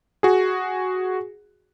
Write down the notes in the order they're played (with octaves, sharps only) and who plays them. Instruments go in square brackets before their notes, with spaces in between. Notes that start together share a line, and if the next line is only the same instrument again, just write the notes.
[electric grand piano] F#4 G#4